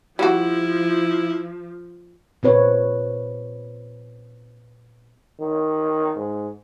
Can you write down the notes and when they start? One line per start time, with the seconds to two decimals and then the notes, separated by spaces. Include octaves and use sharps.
0.19 F3 G3 E4 F#4
2.43 A#2 C4 B4 C#5
5.39 D#3
6.16 G#2